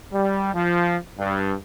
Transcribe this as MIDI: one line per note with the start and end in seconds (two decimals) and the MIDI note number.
0.12 0.53 55
0.54 0.96 53
1.19 1.54 43